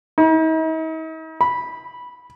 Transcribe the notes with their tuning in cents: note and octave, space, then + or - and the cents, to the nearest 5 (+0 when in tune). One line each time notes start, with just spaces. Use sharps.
D#4 +45
B5 -10